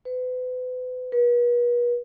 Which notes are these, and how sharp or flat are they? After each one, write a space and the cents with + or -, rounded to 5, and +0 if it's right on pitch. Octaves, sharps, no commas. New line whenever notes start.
B4 +35
B4 -40